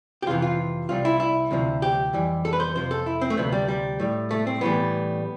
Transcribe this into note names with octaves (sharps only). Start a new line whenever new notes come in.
G4
F2 C3 E3 F4
F4
C2 C3 G3 F4
E4
E4
D2 C3 F3
G4
F2 E3 G3
A4
B4
C5
F2 C3 F3 C5
A4
E4
C4
A3
D2 C3 F3 B3
G3
G3
A2 G3
A3
C4
A2 E3 G3 B3